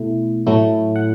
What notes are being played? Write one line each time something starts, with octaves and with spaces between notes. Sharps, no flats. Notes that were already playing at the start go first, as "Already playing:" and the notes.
Already playing: B2 A3 E4
A2 F#3 A3 E4
F#5